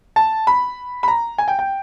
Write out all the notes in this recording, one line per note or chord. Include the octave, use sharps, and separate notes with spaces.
A5
B5
B5
A#5
G#5
G5
G5